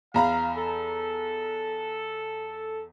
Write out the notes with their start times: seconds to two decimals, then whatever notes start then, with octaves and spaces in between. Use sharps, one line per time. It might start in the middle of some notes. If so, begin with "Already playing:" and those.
0.14 E2 F5 A#5 B5
0.56 A4